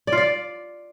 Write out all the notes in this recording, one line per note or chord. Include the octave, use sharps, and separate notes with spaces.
D5
F4
D5